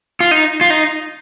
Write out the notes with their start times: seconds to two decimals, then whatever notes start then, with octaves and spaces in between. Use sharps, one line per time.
0.20 F4
0.31 D#4
0.61 F4
0.70 D#4